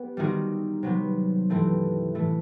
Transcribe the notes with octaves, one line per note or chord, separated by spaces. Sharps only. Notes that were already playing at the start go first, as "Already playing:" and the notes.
Already playing: B3 G4
D#3 G3 C4 D#4 F#4
C3 F#3 B3
G2 E3 A3 C4
A2 E3 A3 E4